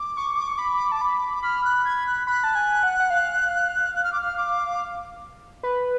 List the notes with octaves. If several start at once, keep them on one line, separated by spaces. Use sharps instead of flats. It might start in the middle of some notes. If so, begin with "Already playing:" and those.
Already playing: D6
C#6
B5
A5
B5
B5 F6
F#6
G#6
F#6
B5 F#6
A5
G#5
F#5
F#5
F5
F#6
F6
D6
F6
D6
B4